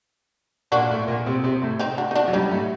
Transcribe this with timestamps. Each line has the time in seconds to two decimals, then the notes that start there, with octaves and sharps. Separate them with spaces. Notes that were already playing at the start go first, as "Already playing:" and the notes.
0.72 A#2 A#3 D4 F#4
0.90 A2 A3
1.07 A#2 A#3
1.26 C3 C4
1.44 C3 C4
1.62 A2 A3
1.79 C4 D#4
1.98 D4 F#4
2.11 D#4
2.15 D4 F#4
2.28 F#3
2.33 G2 G3 D#4 G4
2.51 A2 A3